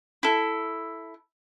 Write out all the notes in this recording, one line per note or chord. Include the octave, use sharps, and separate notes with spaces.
E4 A4